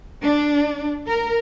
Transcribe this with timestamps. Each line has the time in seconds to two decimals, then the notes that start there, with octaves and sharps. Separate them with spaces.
0.23 D4
1.07 A#4